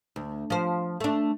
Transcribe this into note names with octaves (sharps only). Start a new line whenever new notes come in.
D2
F3 C5
A3 D4